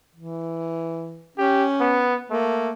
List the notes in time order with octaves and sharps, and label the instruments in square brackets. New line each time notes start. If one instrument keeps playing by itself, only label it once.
[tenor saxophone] E3
[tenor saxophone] C#4 [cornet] G4
[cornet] B3
[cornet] A3 [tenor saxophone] A#3